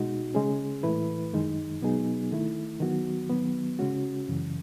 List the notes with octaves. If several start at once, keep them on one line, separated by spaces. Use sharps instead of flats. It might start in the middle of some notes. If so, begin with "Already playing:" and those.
Already playing: B2 G#3 D#4 F#4
C#3 G#3 C#4 G#4
A2 E3 A3 E4 B4
F#2 D#3 G#3 D#4
B2 F#3 B3 D#4 G#4
D#3 A3 E4
D#3 F#3 B3 F#4
D#3 F#3 B3
C#3 G#3 C#4 F#4
F#2 C#3 E3